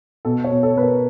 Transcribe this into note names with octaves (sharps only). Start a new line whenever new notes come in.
B2 A4
C#5
B2
A4
B2 B4
A#4